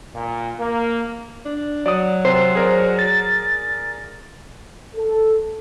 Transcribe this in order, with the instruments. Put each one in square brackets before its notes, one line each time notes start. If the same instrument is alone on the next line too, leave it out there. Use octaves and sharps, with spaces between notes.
[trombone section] A#2
A#3
[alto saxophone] D4
[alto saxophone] F#3 [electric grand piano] D5 D#6
[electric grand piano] C3 [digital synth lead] C5
[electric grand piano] G#4 A#4 D5
[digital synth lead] A6
[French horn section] A4